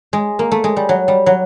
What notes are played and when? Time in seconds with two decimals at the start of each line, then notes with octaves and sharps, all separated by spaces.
0.13 G#3
0.39 A#3
0.51 A3
0.64 G#3
0.76 G3
0.89 F#3
1.08 G3
1.26 F#3